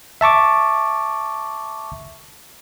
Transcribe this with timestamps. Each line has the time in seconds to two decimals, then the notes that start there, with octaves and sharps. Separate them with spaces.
0.21 E5 A5 C#6 D6